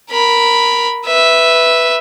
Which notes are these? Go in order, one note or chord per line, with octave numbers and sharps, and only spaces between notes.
A#4 B5
B4 E5